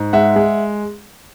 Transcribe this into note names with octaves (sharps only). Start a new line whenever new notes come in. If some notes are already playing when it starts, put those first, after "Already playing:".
Already playing: G#2
G#3 E5 F#5
G#3